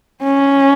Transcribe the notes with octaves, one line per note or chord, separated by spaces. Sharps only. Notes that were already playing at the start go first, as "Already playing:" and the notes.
C#4